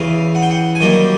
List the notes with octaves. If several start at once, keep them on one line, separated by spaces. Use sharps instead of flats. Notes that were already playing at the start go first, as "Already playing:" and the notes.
Already playing: E2 C#3 E3 F5
F#5
G5
F#5
G#5
F#2 D#3 G3 A#3 G5